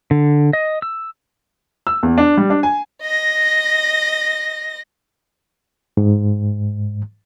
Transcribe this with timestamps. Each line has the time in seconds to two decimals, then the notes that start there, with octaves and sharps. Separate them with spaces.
0.11 D3
0.53 D#5
0.82 E6
1.87 E6
2.03 E2
2.18 D4
2.37 G3
2.50 D4
2.63 G#5
3.03 D#5 A#6
5.97 G#2